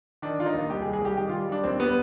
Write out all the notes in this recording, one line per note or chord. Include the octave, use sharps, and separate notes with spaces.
D#3 D4
D#3 F4
D#4
D#2
C2 G4
G#4
C2
G#4
C2 G4
D#3 G4
G3 F4
G3 D4
D#2 C4
G3 B3